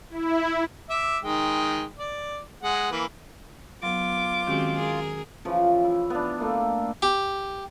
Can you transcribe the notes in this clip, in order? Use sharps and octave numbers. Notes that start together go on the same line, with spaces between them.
E4
E5 D6
D#3 G#3 G5
D5
G#3 F#5
E3 A#3 B4
F#3 B3 F4 D6
D#3 G#3 C4 C#4 F#4 G4
G#4 A#4
C#3 E3 F3 C#4
E4
B3 D4
A3 A#3 E4
G4